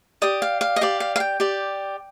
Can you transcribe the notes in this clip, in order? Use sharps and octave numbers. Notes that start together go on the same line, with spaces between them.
G4 D5 D#6
F5
F5
D#5
G4 D5 F5
F5
F5
G5
G4 D5